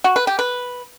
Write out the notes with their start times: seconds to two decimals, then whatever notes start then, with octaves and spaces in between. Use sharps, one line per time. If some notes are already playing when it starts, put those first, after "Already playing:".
0.04 F#4
0.16 B4
0.27 G4
0.39 B4